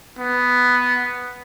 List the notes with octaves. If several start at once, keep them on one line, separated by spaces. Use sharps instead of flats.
B3